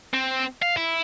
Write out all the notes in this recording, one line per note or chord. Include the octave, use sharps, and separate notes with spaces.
C4
F5
E4